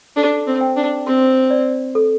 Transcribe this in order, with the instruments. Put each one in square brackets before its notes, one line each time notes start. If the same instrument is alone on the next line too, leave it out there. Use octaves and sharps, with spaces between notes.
[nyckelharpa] D4 [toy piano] A4
[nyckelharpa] C4
[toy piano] G5
[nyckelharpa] D4
[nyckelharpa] C4 [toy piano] C6
[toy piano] D5
A4